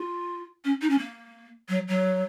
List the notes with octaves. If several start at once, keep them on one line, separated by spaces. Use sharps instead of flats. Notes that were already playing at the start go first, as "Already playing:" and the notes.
Already playing: F4
C#4
D#4
C#4
A#3
F#3
F#3